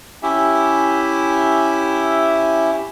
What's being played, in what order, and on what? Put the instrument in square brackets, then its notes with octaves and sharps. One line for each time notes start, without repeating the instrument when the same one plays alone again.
[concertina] C#4 E4 G4 E5